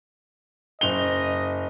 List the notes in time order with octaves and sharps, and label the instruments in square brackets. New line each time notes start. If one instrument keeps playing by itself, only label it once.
[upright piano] F#1 F7 G7 [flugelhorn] D#5